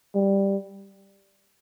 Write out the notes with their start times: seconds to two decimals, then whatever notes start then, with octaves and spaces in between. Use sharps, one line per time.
0.15 G3